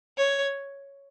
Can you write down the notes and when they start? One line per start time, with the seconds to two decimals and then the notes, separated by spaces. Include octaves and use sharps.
0.18 C#5